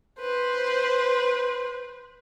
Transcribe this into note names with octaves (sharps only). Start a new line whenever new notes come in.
B4 C5